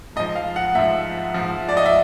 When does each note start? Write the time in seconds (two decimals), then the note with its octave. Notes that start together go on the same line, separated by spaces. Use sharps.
0.16 G#2 D#5
0.20 F3
0.35 F5
0.56 F#5
0.75 G#2 F3 E5
1.34 G#2 F3
1.69 D5
1.77 D#5
1.86 E5